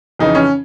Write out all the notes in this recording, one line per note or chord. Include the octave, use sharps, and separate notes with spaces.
F2 C#3 E3 D#4
C#4